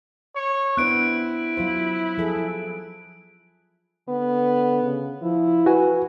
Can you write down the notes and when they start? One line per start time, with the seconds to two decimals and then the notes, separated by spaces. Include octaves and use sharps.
0.36 C#5
0.77 B3 D4 E4 C5 F#6 D7
1.57 F#3 F4 C5
2.18 F3 G#4 A4
4.09 D3 B3
4.83 C#3
5.22 F3 E4
5.66 F#4 B4 G#5